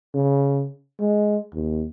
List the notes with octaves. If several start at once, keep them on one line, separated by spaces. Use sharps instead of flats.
C#3
G#3
D#2